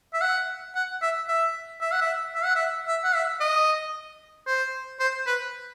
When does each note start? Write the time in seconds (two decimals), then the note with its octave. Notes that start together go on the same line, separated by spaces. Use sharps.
0.14 E5
0.21 F#5
0.75 F#5
1.02 E5
1.28 E5
1.81 E5
1.92 F#5
2.01 E5
2.35 E5
2.44 F#5
2.55 E5
2.88 E5
3.04 F#5
3.15 E5
3.40 D#5
4.47 C5
5.00 C5
5.27 B4